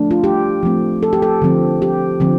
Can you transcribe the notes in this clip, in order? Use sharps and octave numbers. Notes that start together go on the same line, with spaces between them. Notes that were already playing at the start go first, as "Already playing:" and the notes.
Already playing: F3 A3 D4
F4
G4
F3 A3 C4
A4
G4
A4
D3 F3 C4
G4
D3 F3 C4